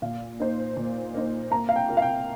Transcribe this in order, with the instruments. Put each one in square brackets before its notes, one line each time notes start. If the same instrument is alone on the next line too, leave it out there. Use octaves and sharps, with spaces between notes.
[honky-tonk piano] A#2 [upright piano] F5
[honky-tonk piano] A#3 D#4 C5
A#2
A#3 D#4 C5
[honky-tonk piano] A#3 [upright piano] A#5
[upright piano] F5
G5
[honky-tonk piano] F4 A#4
[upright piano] F5
G5